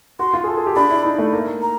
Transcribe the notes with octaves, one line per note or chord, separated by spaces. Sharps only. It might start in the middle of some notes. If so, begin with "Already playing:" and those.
F#4 C6
F4
G#4
A4
G#4
G4
D4 B5
E4
D#4
A3
A#3
A#3
A#5